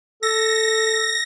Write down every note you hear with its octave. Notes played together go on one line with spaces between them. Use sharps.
A4 A#6